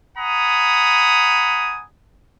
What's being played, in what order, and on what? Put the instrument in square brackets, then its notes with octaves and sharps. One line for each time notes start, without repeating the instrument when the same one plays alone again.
[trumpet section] F#5 G#5 A#5 B5 D#6